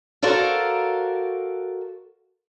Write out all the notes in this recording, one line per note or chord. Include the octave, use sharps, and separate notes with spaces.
F#4 A4 A#4 C5 D5 F5